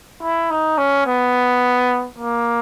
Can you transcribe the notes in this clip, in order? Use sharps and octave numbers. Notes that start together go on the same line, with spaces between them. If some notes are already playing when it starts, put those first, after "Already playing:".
E4
D#4
C#4
B3
A#3